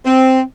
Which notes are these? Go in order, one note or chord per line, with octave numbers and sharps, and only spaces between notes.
C4